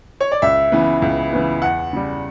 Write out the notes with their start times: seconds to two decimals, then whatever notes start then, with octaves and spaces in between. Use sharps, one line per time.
0.21 C#5
0.31 D5
0.42 C#2 E5
0.72 C#3 E3 B3
1.02 C#2
1.33 C#3 E3 B3
1.62 E2 F#5
1.93 C#3 G3